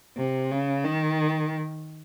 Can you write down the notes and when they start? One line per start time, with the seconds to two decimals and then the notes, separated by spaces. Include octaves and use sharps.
0.17 C3
0.51 C#3
0.85 D#3